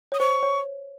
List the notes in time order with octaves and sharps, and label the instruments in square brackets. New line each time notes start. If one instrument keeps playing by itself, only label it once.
[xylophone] C#5 [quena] D#6
[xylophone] C5 [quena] C#6
[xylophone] C#5